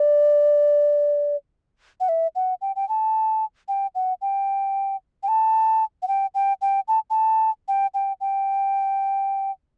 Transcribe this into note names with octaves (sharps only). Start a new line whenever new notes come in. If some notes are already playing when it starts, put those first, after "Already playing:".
Already playing: D5
F#5
E5
F#5
G5
G5
A5
G5
F#5
G5
G5
A5
F#5
G5
G5
G5
A5
A5
G5
G5
G5